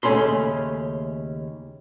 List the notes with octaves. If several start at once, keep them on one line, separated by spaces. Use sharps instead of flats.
D#2 C#3 A3 C#4 B5 C6